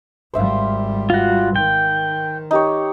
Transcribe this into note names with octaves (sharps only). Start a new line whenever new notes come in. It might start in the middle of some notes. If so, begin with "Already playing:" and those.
G#1 G3 C5 E5 F5
F4 F#4
D#3 G5
D#4 G4 C#5